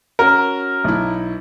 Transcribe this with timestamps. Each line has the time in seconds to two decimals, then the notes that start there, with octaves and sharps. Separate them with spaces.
0.19 C#4 F#4 A#4
0.84 B1 E4